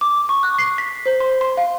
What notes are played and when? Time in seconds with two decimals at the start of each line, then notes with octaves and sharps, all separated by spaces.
0.01 D6
0.29 C#6
0.43 F#6
0.59 C7
0.78 B6
1.06 C5
1.20 C6
1.41 C6
1.57 F5